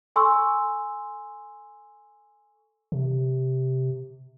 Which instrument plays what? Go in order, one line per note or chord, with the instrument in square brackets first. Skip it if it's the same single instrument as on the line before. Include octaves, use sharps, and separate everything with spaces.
[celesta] A4 G#5 C6 C#6 E6
[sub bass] C3